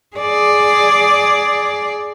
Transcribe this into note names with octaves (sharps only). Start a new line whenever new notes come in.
G#4 D5